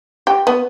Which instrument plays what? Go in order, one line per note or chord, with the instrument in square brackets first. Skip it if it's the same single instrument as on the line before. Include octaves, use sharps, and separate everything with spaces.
[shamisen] G4
B3